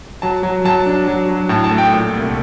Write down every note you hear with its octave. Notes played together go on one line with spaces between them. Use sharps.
F#3 A5
F#3
F#3 A5
D4
F#3
F#3
A2 A5
A5
A3
G5
A#2
C2